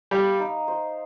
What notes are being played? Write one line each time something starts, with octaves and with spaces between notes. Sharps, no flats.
G3 F5
D#4
C5